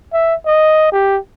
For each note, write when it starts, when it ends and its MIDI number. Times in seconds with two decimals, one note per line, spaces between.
0.13 0.35 76
0.46 0.89 75
0.92 1.18 67